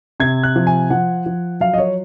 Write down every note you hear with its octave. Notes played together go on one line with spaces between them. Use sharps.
C3 G#6
F#6
F3
G#5
F3 F#5
F3
F#3 F5
D#5
C#5